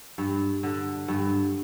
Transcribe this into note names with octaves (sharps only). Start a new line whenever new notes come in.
G2
D3
G2